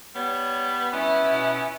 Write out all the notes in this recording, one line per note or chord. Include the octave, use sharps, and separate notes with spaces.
G3 B3 C#5
G2 G3 B3 C#4 E4
B2